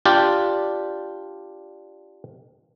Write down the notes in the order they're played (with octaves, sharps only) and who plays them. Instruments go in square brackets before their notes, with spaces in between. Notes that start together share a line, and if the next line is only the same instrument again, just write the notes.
[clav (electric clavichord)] D4 F4 G4 D5